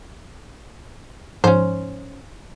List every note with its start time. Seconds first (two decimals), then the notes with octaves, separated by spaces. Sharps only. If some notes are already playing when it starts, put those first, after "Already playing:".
1.44 G#2 F3 C#4 C5